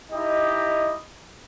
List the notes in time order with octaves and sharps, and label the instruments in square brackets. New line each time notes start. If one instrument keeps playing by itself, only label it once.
[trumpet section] D#4 E4 G4 D#5